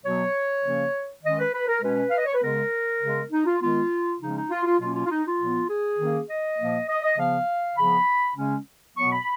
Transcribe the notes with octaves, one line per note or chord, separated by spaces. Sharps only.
B2 F#3 B3 C#5
C#3 F3 A#3 C#4
D#3 G#3 C#4 D#5
B4
B4
A#4
B2 G#3 C#4 B4
F5
D#5
C#5
B4
C#3 G#3 B3 A#4
C#3 G#3 B3
D#4
F4
D#3 G#3 B3 F4
C#3 F3 G#3 C#4 D#4
D#4
F4
F4
B2 F#3 A#3 C#4 F4
F4
F4
D#4
F4
A#2 F3 B3
G#4
D#3 A#3 C#4
D#5
A#2 F3 A#3
D#5
D#5
C#3 F3 B3 F5
C#3 F3 B3 B5
C#3 G#3 C#4
B2 F#3 B3 C#6
B5